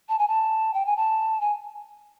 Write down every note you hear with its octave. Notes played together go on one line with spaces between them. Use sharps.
A5
G#5
A5
G5
G#5
A5
G#5